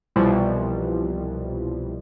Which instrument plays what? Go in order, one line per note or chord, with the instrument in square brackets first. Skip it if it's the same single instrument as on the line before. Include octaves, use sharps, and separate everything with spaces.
[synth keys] C2 B2 E3 F3 G3